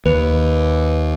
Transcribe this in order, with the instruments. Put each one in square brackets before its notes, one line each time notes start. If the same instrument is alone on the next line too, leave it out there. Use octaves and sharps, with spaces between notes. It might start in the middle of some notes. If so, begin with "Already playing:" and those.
[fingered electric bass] D#2 [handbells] B4